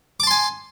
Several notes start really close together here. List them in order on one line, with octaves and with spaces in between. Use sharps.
D6 A5 C6 G#5